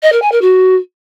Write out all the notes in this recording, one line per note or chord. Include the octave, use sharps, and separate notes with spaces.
D#5
A#4
G#5
A#4
F#4